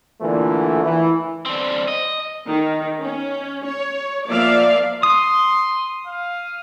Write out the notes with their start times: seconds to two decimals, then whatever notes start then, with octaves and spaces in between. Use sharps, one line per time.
0.21 A#2 D3 E3 A3
0.84 E3
1.46 D3 C4
1.88 D#5
2.47 D#3
3.00 C#4
3.66 C#5
4.27 F3 A#3 D5 E5 F5
5.03 C6 D#6
6.06 F5